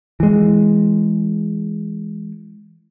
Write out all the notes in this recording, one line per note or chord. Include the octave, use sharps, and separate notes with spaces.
E3 G#3